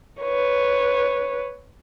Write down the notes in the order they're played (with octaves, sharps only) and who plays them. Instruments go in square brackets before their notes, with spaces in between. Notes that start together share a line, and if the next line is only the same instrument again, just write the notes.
[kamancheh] B4 C#5